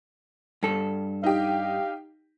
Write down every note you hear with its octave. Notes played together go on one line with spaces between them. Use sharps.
G2 A4
D#4 G4 F5